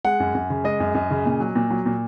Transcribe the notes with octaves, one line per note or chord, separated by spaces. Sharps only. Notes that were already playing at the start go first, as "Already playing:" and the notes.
G#3 F#5
F#2
F#2
C#3
G#3 D#5
F#2
F#2
C#3
A#2
F#3
A#2
F#3
A#2